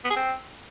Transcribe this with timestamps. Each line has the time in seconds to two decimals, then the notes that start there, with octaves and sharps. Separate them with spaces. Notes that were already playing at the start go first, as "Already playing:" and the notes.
0.04 B3
0.10 G#4
0.16 C4